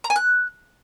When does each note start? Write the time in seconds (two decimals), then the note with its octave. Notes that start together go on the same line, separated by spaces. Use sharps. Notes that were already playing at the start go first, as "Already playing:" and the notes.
0.04 A#5
0.10 G#5
0.16 F#6